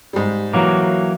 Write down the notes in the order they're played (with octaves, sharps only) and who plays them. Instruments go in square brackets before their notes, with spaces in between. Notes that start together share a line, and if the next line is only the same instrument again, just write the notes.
[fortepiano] G#2 G3
[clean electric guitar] E3 F#3 A#3